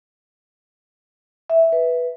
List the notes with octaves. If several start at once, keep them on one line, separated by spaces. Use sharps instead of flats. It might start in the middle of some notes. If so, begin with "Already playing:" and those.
E5
B4